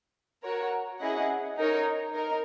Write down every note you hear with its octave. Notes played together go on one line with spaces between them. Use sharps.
F#4 A#4 C#5
C#4 E4 G#4 D#5 F#5
D#4 A#4 C#5
D#4 A#4